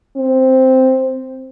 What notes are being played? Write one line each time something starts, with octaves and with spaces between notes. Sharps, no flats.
C4